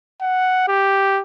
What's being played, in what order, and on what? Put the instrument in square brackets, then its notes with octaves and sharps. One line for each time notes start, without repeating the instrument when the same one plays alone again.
[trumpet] F#5
G4